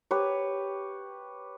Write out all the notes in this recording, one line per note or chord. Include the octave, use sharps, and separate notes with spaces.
G4 B4 C#5